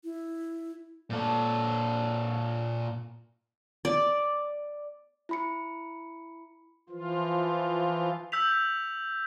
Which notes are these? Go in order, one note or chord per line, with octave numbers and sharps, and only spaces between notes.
E4
A#2 A4
D5
E4 B5 C#7
E3 F3 F4
E6 G6 B6 F7
E6